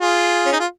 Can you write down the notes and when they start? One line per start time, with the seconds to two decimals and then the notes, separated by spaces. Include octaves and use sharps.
0.01 F4 G#4
0.46 C#4
0.52 D#4
0.60 F4